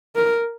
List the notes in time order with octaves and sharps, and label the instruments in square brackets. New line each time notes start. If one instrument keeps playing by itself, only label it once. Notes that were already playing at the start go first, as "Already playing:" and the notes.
[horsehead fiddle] A#4